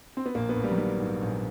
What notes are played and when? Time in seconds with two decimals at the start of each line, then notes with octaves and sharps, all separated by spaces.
0.17 C4
0.26 B3
0.35 A#1 A#3
0.49 B3
0.56 A#1
0.63 G3
0.72 F#3
0.78 D#3 G3
1.00 G#2
1.21 A#1